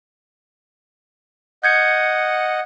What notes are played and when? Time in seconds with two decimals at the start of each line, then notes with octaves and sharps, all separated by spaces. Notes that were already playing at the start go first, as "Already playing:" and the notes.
1.64 D#5 F#5 G6 G#6 C#7